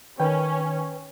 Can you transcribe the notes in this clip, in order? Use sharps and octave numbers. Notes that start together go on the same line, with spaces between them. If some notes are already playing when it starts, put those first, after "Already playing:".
D#3 C#4 B4 G5